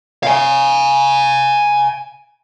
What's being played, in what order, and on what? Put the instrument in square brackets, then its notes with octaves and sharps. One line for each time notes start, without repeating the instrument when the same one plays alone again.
[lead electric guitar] F5 G#5